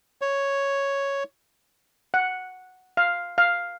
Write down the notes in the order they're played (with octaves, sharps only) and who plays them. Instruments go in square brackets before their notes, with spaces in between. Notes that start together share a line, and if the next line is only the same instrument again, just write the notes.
[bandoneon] C#5
[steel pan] F#5
F5
F5